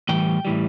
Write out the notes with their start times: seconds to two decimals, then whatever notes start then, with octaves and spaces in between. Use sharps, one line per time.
0.09 A2 E3 G3 G5
0.45 A2 E3 G3